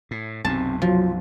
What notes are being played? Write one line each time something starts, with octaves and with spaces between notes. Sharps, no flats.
A2
B1 F#2 C3 C4 A5
F3 F#3 F4